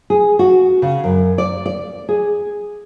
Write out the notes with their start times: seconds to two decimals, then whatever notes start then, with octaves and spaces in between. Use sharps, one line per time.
0.10 G#4
0.39 F#4
0.82 C#3
1.04 F#2
1.38 D5
1.66 D5
2.09 G#4